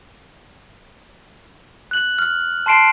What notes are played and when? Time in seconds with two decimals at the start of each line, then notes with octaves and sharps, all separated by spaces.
1.91 F#6 F#7
2.19 F6
2.66 A5 C6 C7 D7 E7